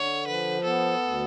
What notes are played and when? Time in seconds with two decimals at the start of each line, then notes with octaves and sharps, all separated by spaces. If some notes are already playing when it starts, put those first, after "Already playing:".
Already playing: D3 C#5
0.27 F3 B4
0.64 B3 A4
1.01 D2